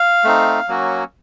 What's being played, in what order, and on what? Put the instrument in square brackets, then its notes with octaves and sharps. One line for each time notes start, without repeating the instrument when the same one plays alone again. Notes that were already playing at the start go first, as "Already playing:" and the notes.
Already playing: [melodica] F5
A3 C4 D#4
F#3 A#3 C#4 F#4